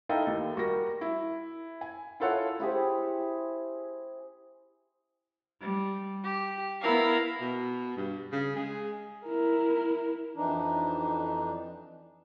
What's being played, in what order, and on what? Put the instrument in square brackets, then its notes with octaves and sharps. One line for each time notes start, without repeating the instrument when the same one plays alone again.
[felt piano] D#4 E4 A4 D#5 F5 G5
D#2
G3 F#4 A#4 A#6
E4
G#5
E4 F4 A4 C#5 F#5
[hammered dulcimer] E4 G4 G#4 C5
[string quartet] G3
G4
B3 E4 A#4 F5
[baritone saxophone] B2
G2
C#3
G#3
[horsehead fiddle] E4 A#4
[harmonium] F2 E3 D4 D#4